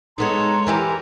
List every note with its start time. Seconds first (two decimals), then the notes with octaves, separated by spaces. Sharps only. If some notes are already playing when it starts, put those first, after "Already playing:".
0.18 G#3 B3 D#4 A4 C#5 A#5 C6
0.67 E3 E4 G4 A#4 G#5